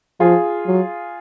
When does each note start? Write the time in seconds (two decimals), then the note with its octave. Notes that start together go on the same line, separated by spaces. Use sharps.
0.20 F3 F4 G#4
0.67 F#3